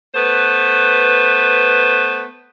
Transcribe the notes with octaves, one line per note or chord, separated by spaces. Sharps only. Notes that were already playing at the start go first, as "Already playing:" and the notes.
A3 B3 B4 C5